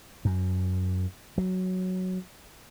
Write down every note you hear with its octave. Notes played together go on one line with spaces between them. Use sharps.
F#2
F#3